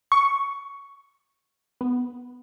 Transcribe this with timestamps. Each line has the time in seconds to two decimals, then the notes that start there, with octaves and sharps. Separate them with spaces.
0.12 C#6
1.81 B3